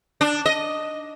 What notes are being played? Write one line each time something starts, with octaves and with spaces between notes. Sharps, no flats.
D4
D#5